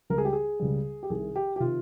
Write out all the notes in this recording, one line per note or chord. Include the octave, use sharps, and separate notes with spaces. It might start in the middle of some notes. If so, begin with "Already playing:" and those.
C#2 C#3 G3 A#4
G#4
G4
G#4
C#2 C#3 G3
G4
C2 C3 D#3 G#4
G4
G4
C3 D#3 F4